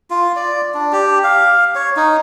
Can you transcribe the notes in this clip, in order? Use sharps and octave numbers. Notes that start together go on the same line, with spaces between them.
F4
D5
D4
G4
F5
C#5
D#4